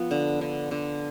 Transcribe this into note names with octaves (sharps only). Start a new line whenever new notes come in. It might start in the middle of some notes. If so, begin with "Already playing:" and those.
Already playing: F3 B3
D3
D3
D3